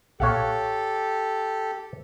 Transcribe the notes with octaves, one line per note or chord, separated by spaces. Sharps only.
B1 A#2 G4 A4 C#5 F5 F#5